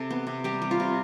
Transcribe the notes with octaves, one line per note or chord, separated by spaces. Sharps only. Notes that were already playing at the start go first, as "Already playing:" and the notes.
Already playing: C3 A4
B3
C3
G3 G4
G3
F4
C3